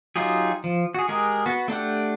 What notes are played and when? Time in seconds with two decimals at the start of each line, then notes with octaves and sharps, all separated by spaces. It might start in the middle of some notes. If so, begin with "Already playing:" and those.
0.16 F#3 D#4 F4 G4 G#4
0.64 F3
0.95 F#4 G#4
1.09 G#3 G4 G#4 A#4
1.46 B3 F#4
1.68 A3 D4 G4 F#5